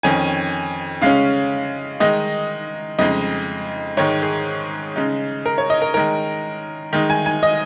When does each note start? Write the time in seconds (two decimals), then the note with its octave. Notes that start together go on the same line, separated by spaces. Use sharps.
0.03 F2 D#3 C#4 G#5
1.02 C#3 G#3 C#4 F5
2.00 D#3 G#3 D#4 D#5
2.99 F2 C#3 G#3 D#4 D#5
3.97 G#2 D#3 G#3 C#5
4.22 G#4
4.96 C#3 G#3 D#4
5.46 A#4
5.58 C#5
5.70 D#5
5.82 A#4
5.94 D#3 G#3 D#4 A#4
6.93 D#3 G#3 D#4
7.10 G#5
7.26 G#5
7.43 D#5